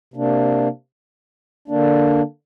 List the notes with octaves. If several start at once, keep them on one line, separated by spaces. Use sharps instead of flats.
C3 A#3 D4
D3 A#3 D4